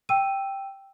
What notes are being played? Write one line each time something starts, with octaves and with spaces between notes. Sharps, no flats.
G5 E6 D#7